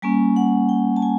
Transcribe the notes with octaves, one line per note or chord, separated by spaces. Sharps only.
G3 A#3 C#4 G#5
F#5
G5
A5
G#5